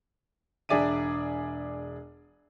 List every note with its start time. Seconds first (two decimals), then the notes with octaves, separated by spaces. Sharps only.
0.69 E1 D4 G#4 D5 E5 D#7